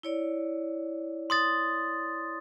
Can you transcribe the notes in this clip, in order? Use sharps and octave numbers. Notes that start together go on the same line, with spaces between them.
E4 C#5 D5
C6 D#6 A6